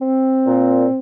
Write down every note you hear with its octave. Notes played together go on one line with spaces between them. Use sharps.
C4
A#2